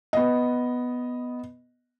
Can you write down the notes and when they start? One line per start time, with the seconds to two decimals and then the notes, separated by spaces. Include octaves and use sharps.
0.13 B3 D#5